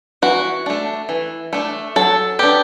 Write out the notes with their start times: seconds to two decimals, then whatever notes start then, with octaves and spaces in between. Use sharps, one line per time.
0.22 E3 F#4
0.66 A3 D4
1.09 E3
1.53 A3 D4
1.96 F#3 A4
2.39 B3 D4 G4